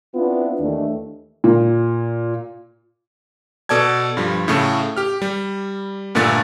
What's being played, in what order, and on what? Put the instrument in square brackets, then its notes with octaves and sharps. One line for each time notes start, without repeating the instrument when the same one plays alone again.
[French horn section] B3 C4 D4 E4 F4
D#2 D#3 E3 A3 D4
[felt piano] A#2
[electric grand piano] B2 A4 D5 A5 G#6
G2 F3 G3
A2 C#3 A3
G4 F6
G3
G2 A#2 D3 A3 A6